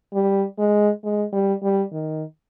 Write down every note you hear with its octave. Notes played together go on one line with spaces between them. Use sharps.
G3
G#3
G#3
G3
G3
D#3